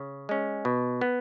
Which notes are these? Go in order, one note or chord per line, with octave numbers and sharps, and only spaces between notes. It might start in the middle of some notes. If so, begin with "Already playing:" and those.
Already playing: C#3
G#3 C#4
B2
B3